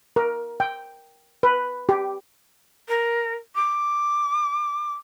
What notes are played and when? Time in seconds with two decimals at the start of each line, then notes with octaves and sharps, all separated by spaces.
0.16 A#4
0.60 G5
1.43 B4
1.89 G4
2.88 A#4
3.55 D6